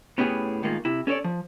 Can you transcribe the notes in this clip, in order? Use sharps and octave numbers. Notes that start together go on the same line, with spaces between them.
A2 B3 C#4 G4 G#4
A2 D#3 G#3 A#3 F4
C3 E4
C#4 A4 A#4 C#5 D5
F3